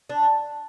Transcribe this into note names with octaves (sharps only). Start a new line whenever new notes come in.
D4